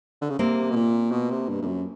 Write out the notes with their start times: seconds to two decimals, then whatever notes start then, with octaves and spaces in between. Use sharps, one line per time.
0.22 D3
0.30 C#3
0.39 C3 A#3 C4
0.70 B2
0.76 A#2
1.11 B2
1.30 C3
1.48 G2
1.62 G2
1.66 F#2